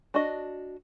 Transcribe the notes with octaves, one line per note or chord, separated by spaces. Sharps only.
D4 F#4 D#5